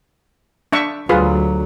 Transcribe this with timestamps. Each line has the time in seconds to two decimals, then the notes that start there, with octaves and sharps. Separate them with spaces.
0.72 D4 E5 C#6
1.09 D2 F#3 F4 G#4 B4